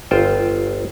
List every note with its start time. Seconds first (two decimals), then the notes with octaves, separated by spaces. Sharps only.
0.11 G1 F4 C5 G5